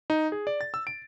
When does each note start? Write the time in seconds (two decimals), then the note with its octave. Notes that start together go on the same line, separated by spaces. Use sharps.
0.10 D#4
0.32 G#4
0.47 D5
0.61 A6
0.74 E6
0.87 D7